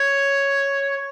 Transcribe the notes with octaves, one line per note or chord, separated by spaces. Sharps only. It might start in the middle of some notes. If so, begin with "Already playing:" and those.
Already playing: C#5